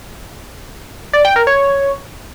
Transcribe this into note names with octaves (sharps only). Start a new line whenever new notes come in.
D5
G5
A#4
C#5